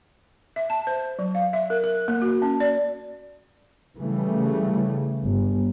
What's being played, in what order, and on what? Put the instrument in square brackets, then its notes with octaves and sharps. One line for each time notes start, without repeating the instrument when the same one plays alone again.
[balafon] E5
A5
C5
F#3
F5
E5
A#4
A#4
A#3
F#4
C#4
D5
[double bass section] C#3 E3 G3 A3
G1